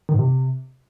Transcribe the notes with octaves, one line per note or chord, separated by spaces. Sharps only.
D#3
G#2
C3